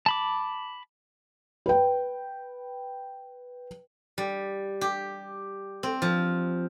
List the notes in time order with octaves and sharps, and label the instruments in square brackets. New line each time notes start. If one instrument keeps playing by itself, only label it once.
[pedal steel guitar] A5 B5 D6
[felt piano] B4 G5
[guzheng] G3
G4
C4
F3